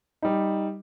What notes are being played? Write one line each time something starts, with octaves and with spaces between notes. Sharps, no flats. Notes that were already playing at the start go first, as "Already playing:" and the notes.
G3 D#4